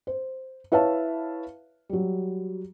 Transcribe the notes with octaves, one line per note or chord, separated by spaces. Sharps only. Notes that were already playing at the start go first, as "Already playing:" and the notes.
C5
E4 B4 C#5 E5 F5 A5
F#3 G3